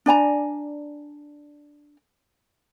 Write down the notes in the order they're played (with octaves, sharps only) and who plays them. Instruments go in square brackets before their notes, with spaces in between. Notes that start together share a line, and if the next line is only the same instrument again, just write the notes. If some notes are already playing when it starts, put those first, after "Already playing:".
[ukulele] D4 D5 G#5 A#5